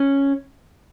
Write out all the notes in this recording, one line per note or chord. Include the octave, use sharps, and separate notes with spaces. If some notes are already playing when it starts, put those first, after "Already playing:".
Already playing: C#4